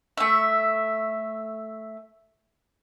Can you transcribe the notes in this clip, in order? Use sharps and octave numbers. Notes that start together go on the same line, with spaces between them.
A3 E5